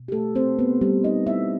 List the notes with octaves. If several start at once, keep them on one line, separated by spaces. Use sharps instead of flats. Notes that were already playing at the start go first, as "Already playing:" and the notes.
Already playing: B2
G4
A3 A4
C4 C5
B3 B4
G3 G4
D#4 D#5
E4 E5